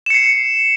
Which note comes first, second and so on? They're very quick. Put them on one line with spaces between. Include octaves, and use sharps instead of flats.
E7 C#7 C7